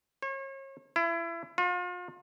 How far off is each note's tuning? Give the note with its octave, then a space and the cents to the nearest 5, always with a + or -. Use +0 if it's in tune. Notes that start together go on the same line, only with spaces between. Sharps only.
C#5 -40
E4 +30
F4 +40